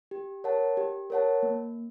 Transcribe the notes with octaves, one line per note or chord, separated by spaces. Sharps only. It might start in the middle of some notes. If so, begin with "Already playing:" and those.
G4
A#4 C#5 F#5 A5
G4
A#4 C#5 F#5 A5
A#3